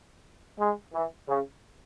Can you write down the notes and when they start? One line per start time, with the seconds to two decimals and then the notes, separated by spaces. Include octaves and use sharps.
0.59 G#3
0.93 E3
1.28 C#3